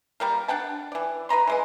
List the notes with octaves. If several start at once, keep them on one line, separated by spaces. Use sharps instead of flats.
G3 A#3 A#4
D4 F#5 G5 A5
E3 D5
B4 D#5 A#5 C6
E3 G#3 D#5